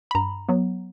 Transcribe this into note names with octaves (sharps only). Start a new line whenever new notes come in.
B5
G2 A#5
F#3 B3